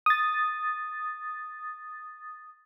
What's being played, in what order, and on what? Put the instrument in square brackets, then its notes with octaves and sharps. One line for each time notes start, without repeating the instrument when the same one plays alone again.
[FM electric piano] D#6 A6